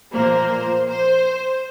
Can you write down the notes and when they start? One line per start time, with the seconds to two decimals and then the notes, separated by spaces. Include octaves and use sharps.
0.12 A#2 F3 A#3 C5
0.87 C5